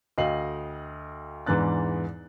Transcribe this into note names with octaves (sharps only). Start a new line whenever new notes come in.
D2 D#5 F5 G5 C7 F#7
E2 G#2 E3 D4 F#6 A6